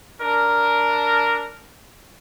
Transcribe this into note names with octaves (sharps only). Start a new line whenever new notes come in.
D4 A#4